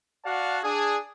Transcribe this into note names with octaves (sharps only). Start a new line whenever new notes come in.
F#4 D5 F5 F#5 A5
D4 G#4